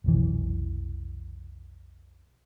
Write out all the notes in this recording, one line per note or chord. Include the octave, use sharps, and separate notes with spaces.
F1 B1 E3